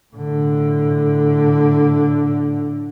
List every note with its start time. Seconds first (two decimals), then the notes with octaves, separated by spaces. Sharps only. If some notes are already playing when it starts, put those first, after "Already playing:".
0.14 A2 D3